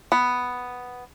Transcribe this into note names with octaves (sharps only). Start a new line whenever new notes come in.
B3